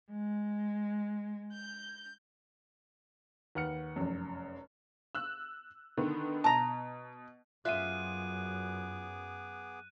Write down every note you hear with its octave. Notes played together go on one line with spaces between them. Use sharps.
G#3
G6
D#2 B4 F#5 F6 C#7
F1 F#2
E6 F#6
D3 D#3 B3
B2 A5 A#5
F#2 B3 F4 G#4 E5 D6 F#6 D#7